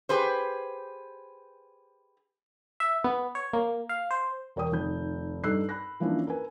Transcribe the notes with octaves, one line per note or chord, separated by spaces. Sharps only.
G4 G#4 B4 C5
E5
B3
C#5
A#3
F5
C5
E1 A#4 C#5 G5 D#6
F1 D#3 G6
G2 D#4 A4 E6 F#6 C7
B5 F#6 A#6
E3 F3 A#3 C#4 D4 E4
A#4 B4 G#5